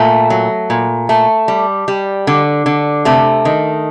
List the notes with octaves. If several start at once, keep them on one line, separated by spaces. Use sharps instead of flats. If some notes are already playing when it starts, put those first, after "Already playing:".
Already playing: A#2 A3
F#3
A#2
A3
G3
G3
D3
D3
C3 A3
D#3